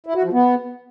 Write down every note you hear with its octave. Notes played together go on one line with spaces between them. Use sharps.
E4
F#4
F3
B3